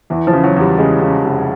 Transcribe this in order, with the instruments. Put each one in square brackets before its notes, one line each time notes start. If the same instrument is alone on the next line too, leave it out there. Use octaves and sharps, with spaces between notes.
[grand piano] E2 [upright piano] E3
[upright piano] F3
[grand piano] C#3
[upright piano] F#3
[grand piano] E2 [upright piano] G3
[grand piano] C#3 [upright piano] G#3
[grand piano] C#3
F1